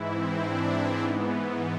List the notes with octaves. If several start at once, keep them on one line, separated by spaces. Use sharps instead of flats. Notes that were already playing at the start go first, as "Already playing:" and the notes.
Already playing: G#2 E3 E4
C4
D4
G#2 E3 B3